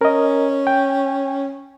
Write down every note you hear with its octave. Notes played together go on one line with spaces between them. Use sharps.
C#4 A#4 D#5
G5